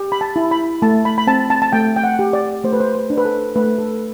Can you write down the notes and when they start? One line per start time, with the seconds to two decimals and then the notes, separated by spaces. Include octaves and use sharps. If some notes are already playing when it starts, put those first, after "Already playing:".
Already playing: G4
0.12 B5
0.21 A5
0.36 E4
0.51 B5
0.82 A3 A5
1.05 B5
1.18 B5
1.27 C4 A5
1.50 A5
1.62 A5
1.72 A3 G5
1.96 G5
2.04 F#5
2.19 G4
2.33 D5
2.64 A3 C5
2.73 B4
2.80 C5
2.95 B4
3.10 D4
3.17 B4
3.25 A4
3.56 A3 B4
3.78 A4